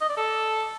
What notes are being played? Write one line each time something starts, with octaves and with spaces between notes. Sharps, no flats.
D#5
D5
A4